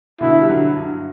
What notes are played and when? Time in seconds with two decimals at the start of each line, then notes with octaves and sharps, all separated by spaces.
0.21 B2 D3 E4
0.42 G3
0.49 D3 F#3
0.76 G2